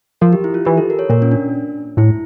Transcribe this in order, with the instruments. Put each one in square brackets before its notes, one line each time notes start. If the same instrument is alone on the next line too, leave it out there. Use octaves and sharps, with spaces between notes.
[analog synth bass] F3 [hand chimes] A#4
[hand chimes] G4
E4
F4
[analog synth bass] E3 [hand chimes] G4
[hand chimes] A4
A#4
C#5
[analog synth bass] A#2 [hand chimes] A#4
[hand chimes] C#4
D4
[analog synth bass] A2 [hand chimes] E4